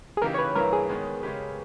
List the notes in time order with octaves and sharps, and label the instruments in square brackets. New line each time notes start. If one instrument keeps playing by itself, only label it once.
[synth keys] G#4
[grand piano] C#3 E3 A#3 D#4 G4 [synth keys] A#4
[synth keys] C#5
B4
[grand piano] G2 E3 A#3 E4 [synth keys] A#4
[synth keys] G#4
[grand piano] D#3 G#3 B3
C#3 G#3 C#4 G4 B4